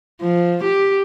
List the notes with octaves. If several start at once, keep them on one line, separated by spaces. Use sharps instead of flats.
F3
G4